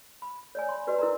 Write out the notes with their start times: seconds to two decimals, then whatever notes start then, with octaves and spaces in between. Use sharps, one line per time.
0.22 B5
0.55 C#5 D5 G#5
0.69 B5 C6
0.87 F#4 B4 D5 D#5
0.99 E4 A#4 D5 A#5